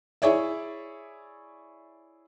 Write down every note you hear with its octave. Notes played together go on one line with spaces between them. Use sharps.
E4 G#4 C#5 D5 E5